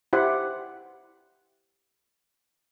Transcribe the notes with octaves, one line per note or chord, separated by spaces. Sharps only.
E4 G4 C5 F#5